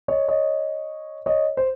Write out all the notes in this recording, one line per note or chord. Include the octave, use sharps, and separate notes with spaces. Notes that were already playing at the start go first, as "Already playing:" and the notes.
C#5 D#5
C#5 D#5
C#5 D#5
C5